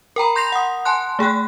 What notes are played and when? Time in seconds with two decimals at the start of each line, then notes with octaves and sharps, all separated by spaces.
0.16 A#4 G5 A#5 B5
0.36 C6 G6 A#6 C7 F7
0.52 F#5 D#6
0.85 G#5 A5 C6 F#6
1.19 A3 G#4 G5 F#6